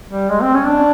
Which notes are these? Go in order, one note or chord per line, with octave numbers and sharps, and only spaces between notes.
G3
G#3
C4
C#4
D4